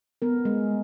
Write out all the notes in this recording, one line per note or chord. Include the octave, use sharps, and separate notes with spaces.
B3 A#4
G#3